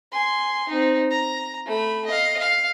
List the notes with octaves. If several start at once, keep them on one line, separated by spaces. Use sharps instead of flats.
G#5 C6
C4 D#4
A#5
A3 B5
D#5 F5
F5